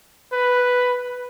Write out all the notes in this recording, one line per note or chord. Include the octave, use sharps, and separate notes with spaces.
B4